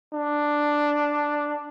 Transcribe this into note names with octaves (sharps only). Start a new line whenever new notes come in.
D4